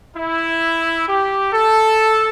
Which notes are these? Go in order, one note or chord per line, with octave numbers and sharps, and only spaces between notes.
E4
G4
A4